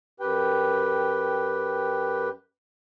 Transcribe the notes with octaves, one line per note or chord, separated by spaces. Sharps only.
F#2 G4 B4 G5